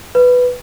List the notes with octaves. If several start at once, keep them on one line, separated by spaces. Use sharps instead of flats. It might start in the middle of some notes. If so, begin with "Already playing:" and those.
B4